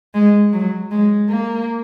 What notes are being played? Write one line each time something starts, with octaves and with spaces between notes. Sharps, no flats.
G#3
F#3
G#3
A#3